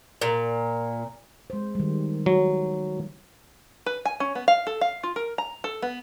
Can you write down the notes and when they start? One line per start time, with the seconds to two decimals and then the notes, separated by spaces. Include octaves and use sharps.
0.22 A#2
1.50 G#3 C5
1.75 D#3 G3
2.26 F#3
3.86 B4
4.05 G#5
4.20 C#4
4.35 B3
4.48 F5
4.67 A4
4.81 F5
5.03 F4
5.16 A#4
5.38 A#5
5.64 A4
5.82 B3